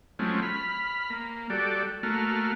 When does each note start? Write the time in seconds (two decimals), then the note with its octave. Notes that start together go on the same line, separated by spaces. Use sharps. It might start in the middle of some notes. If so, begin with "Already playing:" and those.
0.19 F#3 G#3 A3 C4 C#4 F4
0.42 B5 F6
1.10 A#3
1.50 G3 F#4 A4 D5
2.03 A3 A#3 F#4 F6